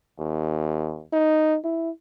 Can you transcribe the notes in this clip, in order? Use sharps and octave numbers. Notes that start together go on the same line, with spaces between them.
D#2
D#4
E4